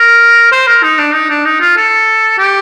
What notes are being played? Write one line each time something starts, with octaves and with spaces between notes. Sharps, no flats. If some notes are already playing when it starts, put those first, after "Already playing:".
Already playing: A#4
C5
A#4
D#4
D4
D#4
D4
D#4
F4
A4
G4